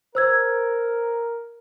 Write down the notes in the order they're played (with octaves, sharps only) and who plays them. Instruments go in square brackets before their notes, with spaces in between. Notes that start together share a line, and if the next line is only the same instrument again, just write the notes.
[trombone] A#4 [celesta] C5 E6 G#6